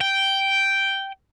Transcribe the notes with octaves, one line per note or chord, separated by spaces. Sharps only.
G5